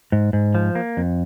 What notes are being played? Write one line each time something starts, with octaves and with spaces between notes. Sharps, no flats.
G#2
G#2
F3
A#3
F2